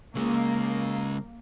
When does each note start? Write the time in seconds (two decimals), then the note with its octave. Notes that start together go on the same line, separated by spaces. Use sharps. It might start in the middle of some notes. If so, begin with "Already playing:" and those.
0.15 C#3 G#3 A#3